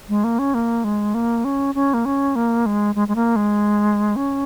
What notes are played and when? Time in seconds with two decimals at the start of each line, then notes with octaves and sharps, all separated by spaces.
0.09 G#3
0.24 A#3
0.39 C#4
0.54 A#3
0.84 G#3
1.14 A#3
1.44 C#4
1.75 C#4
1.94 A#3
2.05 C#4
2.36 A#3
2.66 G#3
2.95 G#3
3.08 G#3
3.15 A#3
3.36 G#3
4.16 C#4